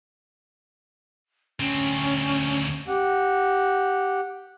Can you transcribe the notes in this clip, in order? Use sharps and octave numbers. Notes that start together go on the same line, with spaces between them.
D2 C4 C#4
G4 F#5